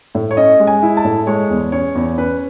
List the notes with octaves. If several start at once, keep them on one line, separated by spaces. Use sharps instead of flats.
A2
C#5
C#4 D#5
G#3
G#5
E4
A5
A2
G#3 C#5
E2
C#4 C#5
E2
C#4 B4